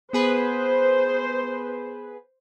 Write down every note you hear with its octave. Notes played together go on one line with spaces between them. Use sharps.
B3 G#4 B4 C5